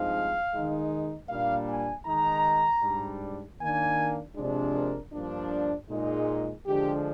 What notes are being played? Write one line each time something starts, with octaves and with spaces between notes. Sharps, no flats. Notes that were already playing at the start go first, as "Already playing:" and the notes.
Already playing: G2 F3 G#3 C4 D#4 F5
D#3 G#3 D#4
A#2 G3 A#3 D4 F5
G#5
D#3 G#3 D#4 A#5
G#2 G3 D4
D#3 A#3 D4 G#5
C3 F3 G#3 D4
A#4
G2 F3 A#3 D4
A#2 G#3 D#4
D3 F3 G#3 D4 G4